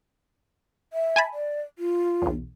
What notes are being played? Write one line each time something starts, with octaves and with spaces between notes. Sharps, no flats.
E5
G#5 A5 B5
D5
F4
B1 E2